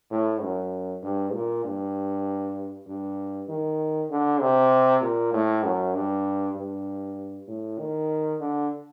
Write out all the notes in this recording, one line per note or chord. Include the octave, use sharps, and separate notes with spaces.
A2
F#2
G2
A#2
G2
G2
D#3
D3
C3
A#2
A2
F#2
G2
G2
A2
D#3
D3